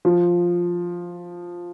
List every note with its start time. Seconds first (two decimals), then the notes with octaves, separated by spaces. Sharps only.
0.05 F3